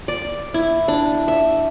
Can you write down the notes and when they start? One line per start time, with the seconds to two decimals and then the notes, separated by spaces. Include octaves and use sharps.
0.08 D5
0.54 E4
0.88 D4
1.28 E5